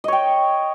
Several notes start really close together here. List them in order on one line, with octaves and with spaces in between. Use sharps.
D#5 C#5 G5